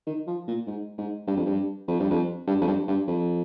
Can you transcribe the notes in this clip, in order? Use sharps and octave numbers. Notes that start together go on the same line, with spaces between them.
D#3
F3
A#2
G#2
G#2
G2
F2
G2
F2
G2
F2
G2
F2
G2
G2
F2